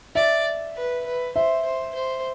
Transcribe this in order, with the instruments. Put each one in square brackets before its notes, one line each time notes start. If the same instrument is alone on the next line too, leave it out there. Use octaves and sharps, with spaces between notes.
[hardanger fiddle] D5 [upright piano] E5
[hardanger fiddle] B4
B4
[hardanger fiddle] C5 [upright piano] E5
[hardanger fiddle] C5
C5